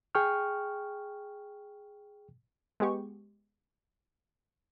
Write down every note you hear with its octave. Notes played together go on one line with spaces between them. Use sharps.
G#4 G5 C#6 F6
G#3 B3 G4 C#6